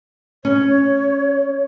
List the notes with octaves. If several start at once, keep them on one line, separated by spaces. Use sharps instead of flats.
C#4 C#5